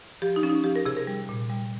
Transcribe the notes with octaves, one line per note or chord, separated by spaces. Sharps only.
F3 G4
D#4
F3 C#4
D#4
F3 G4
A#4
C3 G#4
A#4
G3
A#2
G3